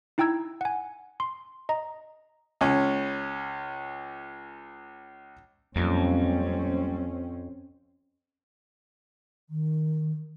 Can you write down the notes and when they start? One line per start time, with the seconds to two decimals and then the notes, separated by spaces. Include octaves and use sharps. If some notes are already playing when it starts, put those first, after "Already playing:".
0.18 D#4 E4 G5 A#5 E6 G#6
0.61 F#5 G#5
1.20 C6
1.69 D#5 A#5
2.61 C#2 C#4
5.76 F2 F#3 G3 A#3 C4 C#4
9.50 D#3